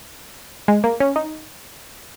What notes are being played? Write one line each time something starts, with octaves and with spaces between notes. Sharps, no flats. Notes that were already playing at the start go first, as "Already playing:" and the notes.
G#3
A#3
C#4
D#4